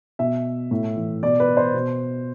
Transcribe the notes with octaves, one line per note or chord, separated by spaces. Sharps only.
B2 E5
A2
E3
B2 D5
B4
C5
B2